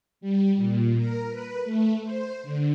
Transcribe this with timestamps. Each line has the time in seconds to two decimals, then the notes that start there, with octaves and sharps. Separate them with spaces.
0.21 G3
0.56 A#2
0.98 A#4
1.30 B4
1.64 A3
2.04 C5
2.43 D3